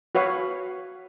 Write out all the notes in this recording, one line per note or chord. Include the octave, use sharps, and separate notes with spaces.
F#4 B4 C#5 F5